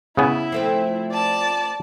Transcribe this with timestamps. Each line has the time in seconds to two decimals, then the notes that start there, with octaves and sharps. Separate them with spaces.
0.17 C#3 B3 E4 G#5
0.52 F3 A3 C4
1.12 D5 A5